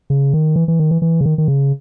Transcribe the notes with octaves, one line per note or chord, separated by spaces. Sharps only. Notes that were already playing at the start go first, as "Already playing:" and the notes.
C#3
D#3
E3
E3
D#3
E3
E3
C#3
D#3
D#3
C#3